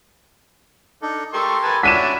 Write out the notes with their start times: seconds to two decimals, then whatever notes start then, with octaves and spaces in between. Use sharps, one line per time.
1.02 D4 D#4 A4
1.33 G4 A4 A#4 C6 C#6
1.63 B4 G#5 A5
1.83 C#4 D4 E4 F#4 B6 D#7 E7